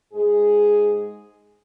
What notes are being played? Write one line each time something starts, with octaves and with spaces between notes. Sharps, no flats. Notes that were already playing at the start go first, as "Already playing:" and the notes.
G#2 G#3 G#4